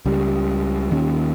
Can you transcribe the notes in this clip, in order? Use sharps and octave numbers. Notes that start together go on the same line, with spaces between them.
C#2 C#3 G3
D#2 D#3 A#3 C#4